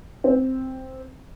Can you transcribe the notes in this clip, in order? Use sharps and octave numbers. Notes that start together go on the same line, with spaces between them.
C4